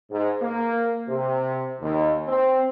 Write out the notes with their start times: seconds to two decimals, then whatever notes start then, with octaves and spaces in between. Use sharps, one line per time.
0.10 G#2
0.41 A#3
1.08 C3
1.80 D#2
2.27 C4